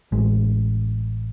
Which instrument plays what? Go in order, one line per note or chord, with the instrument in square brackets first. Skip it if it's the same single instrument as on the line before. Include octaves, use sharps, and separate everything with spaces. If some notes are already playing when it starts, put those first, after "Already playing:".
[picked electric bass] A1 G#3